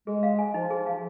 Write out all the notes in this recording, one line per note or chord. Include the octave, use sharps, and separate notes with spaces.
G#3 G#4
F5
G#5
F3 D#4
G#4
F5